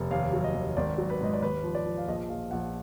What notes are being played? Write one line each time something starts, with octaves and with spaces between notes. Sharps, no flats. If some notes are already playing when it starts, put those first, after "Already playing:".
Already playing: F1
D#2 F5
F#3
D#5
D#2
G#1 D5
F#3
B4
G#2 D#5
D5
D#2 B4
F3
D5
F3
F5
A#1 D#5
A#1 F5
A#1 F#5